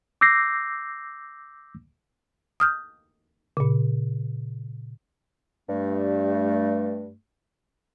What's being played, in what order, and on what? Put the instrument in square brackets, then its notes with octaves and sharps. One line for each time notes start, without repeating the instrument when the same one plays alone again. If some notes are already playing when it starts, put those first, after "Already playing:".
[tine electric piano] D6 E6 G6 A#6 C7
[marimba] D#6 F6 G6
A#2 C#3
[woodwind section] G2 A3